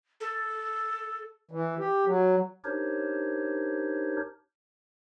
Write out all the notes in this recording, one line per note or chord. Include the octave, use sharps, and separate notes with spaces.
A4
E3
G4
F#3
D4 D#4 G4 A#4 C5 C#5